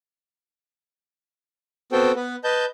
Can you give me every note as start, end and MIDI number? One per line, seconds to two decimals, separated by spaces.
1.92 2.12 59
1.92 2.12 60
1.92 2.12 66
1.92 2.12 69
1.92 2.12 72
1.92 2.12 79
2.15 2.36 59
2.15 2.36 71
2.44 2.65 71
2.44 2.65 75
2.44 2.65 81
2.44 2.65 91